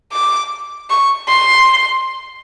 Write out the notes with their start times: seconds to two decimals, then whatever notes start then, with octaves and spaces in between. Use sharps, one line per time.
0.13 D6
0.90 C#6
1.28 C6